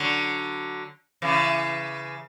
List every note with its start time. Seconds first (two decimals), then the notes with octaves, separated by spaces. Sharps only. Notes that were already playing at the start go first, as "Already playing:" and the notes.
Already playing: D3 F#3
1.22 C#3 E3